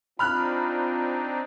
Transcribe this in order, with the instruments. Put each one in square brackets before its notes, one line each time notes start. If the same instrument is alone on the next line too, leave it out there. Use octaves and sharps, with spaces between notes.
[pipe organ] C4 D4 D#4 [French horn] F4 [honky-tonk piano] B5 F6 F#6